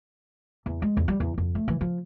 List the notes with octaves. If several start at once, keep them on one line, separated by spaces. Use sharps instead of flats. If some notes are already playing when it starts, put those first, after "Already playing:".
E2
G#3
E2
G3
E2
F2
A3
E3
F3